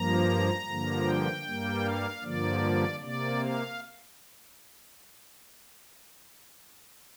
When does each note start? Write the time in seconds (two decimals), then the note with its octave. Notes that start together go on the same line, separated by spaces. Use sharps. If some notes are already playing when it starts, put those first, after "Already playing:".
Already playing: G2 F3 A#3 A#5
0.65 G2 D3 F3 A#3
1.05 G5
1.44 G2 G3 A#3
1.83 F5
2.22 G2 D3 F3 A#3 D5
3.00 C3 A#3 D5
3.39 F5